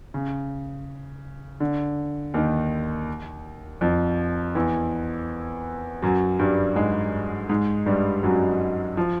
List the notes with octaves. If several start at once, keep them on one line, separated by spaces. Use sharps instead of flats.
C#3
D3
D#2 D#3
F2 F3
E2 E3
F#2 F#3
G2 G3
G#2 G#3
G#2 G#3
G2 G3
F#2 F#3
F3